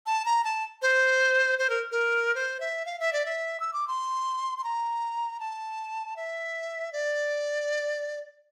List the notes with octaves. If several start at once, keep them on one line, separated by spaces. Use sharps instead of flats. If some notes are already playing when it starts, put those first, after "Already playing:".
A5
A#5
A5
C5
C5
A#4
A#4
C5
E5
F5
E5
D5
E5
E6
D6
C6
C6
A#5
A5
E5
D5